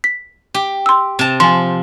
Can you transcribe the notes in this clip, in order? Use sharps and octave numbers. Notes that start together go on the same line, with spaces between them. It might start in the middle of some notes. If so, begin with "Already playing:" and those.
B6
G4
C6 E6
C3 A5
F3 G#5 C6